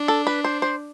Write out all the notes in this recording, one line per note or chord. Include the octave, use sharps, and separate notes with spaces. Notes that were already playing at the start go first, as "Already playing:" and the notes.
Already playing: D4
A4
B4
C5
C5